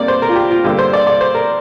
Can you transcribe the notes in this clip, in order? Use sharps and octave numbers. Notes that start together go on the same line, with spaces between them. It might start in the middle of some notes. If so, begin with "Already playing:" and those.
Already playing: C2 C3 A#3 D4 D5
C5
A#4
F4
G4
F4
G2 D3 A#3 D4 G4
C5
D5
D5
C5
A#4